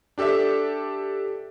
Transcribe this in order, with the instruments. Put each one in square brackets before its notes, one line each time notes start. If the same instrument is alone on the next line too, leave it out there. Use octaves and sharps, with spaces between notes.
[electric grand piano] D4 G4 A4 D5 E5